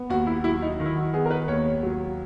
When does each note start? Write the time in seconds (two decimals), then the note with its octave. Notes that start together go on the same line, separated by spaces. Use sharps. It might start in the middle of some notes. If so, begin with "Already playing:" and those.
Already playing: B3
0.10 D#2 F#4
0.27 E4
0.44 F#3 E4
0.62 D#4
0.80 D#3
0.86 E4
0.96 F#4
1.13 B3 G#4
1.26 A#4
1.31 B4
1.48 D#2 C#5
1.83 F#3